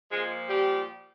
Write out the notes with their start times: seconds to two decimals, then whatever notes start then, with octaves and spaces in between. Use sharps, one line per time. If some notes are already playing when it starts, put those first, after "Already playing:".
0.11 A#2 F3 G#3 G#4
0.49 G3 G4